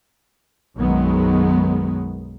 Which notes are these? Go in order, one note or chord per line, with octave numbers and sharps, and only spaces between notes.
B1 F#2 D#3 F#3 G#3 B3